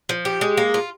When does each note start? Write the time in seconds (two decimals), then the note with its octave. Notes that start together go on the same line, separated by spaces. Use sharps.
0.09 F3
0.25 G4
0.41 G#3
0.57 A#3
0.74 F4